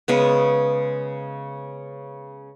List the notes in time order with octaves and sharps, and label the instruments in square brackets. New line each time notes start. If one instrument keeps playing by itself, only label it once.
[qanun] C#3 G#3 B3